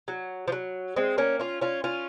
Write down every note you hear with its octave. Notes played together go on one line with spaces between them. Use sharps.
F#3
F3
F#3
G#3 C4
A#3 C#4
C#4 F4
C#4 F4
C#4 F4